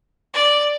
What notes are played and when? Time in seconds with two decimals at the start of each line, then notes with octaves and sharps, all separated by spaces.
0.34 D5